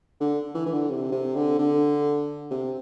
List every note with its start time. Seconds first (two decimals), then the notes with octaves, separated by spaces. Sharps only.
0.20 D3
0.55 E3
0.66 E3
0.73 D3
0.90 C3
1.12 C3
1.35 D3
1.58 D3
2.51 C3